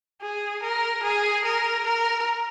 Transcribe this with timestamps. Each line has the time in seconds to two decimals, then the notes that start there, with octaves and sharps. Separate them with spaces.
0.22 G#4
0.63 A#4
1.03 G#4
1.45 A#4
1.86 A#4